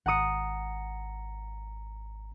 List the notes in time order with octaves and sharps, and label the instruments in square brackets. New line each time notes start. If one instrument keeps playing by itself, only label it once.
[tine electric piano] G#1 A#5 C#7 [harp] F#5 D#6